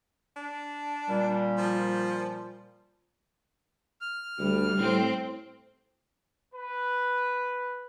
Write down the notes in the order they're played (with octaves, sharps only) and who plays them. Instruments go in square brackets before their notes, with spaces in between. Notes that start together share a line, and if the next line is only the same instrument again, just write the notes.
[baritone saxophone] D4
[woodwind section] A#2 G3
[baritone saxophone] F3
[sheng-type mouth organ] F6
[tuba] D2 [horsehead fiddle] G3
[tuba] A2 [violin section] C4
[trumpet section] B4